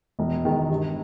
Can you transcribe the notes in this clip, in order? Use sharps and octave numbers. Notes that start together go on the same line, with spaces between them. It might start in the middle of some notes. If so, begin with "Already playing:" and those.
E1
E2 D#3 G#3
G2